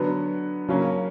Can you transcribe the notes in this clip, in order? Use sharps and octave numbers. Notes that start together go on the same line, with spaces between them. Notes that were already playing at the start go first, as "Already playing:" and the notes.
Already playing: D3 F#3 B3
C#3 F#3 A#3 C#4